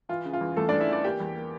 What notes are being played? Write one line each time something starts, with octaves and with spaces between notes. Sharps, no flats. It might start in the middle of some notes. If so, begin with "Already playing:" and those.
E3 F4
C#3
F4
E2
E2 A3 A4
D4 D5
E2
E4 E5
E3 D4 D5
A#3 G4 G5
E2
A#3